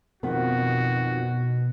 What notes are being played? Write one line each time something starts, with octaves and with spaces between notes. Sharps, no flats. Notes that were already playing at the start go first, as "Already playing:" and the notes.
F2 B2 D#3 B3 F#4